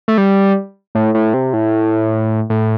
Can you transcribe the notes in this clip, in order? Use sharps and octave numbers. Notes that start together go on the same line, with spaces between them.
A3
G3
A2
A2
C3
A2
A2